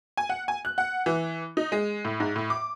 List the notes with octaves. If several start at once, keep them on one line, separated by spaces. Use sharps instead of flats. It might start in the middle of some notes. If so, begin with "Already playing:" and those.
G#5
F#5
G#5
F#6
F#5
E3
D#4
G#3
A2
G#2
A2
D6